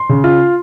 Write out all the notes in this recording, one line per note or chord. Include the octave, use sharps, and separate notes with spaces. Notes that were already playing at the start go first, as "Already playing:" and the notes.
Already playing: C6
C#3
F4